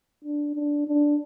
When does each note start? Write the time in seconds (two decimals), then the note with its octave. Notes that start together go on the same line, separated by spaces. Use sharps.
0.25 D4
0.56 D4
0.87 D4